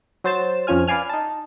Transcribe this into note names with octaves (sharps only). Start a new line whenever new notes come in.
F#3 C5 A6 E7
F2 F3 C#4 F4 G#5 F6
B4 D5 F5 G#5 F6
D#4 A5